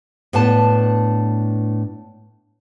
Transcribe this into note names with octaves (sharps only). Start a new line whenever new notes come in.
A2 B3 D4 A5